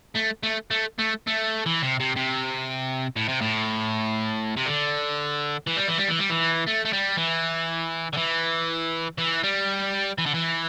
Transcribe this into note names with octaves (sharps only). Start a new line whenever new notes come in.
A3
A3
A3
A3
A3
E3
C3
C3
C3
A2
C3
A2
C3
D3
E3
G3
E3
G3
E3
G3
E3
A3
A3
G3
E3
D3
E3
E3
G3
E3
D3
E3